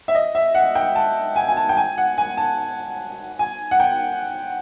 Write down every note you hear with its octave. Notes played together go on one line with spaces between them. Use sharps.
E5
D#5
E5
F#5
G5
A5
G#5
G#5
A5
G5
G#5
F#5
G#5
A5
G#5
F#5
G5